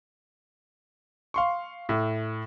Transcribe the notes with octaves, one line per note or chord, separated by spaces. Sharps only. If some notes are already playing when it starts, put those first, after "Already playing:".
F5 C6 C#6
A2